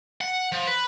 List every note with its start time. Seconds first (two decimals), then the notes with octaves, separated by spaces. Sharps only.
0.21 F#5
0.52 F3
0.67 B4